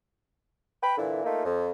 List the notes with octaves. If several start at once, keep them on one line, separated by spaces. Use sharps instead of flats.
B4 G5 B5
A#2 D3 E3 E4
A3 A#3 D#4 F4
F2